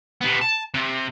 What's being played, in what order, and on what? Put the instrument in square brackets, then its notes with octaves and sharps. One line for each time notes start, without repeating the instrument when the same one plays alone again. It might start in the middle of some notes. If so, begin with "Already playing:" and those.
[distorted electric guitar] C3 B3
A5
C3